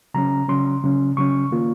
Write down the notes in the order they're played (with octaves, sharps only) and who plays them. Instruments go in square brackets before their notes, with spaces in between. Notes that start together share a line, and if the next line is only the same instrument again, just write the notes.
[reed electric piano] C#3 F#3 C#4 A#5
C#3 F#3 C#4 C6
C#3 F#3 C#4
C#3 F#3 C#4 C#6
D#3 A#3 F4